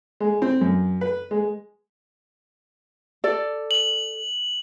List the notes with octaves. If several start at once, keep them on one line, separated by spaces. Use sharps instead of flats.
G#3
C4
F#2
B4
G#3
A4 D5
F#7